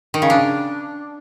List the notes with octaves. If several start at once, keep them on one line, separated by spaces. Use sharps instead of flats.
D#3
C#3
D4